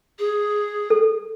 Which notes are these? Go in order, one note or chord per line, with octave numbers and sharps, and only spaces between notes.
G#4
A4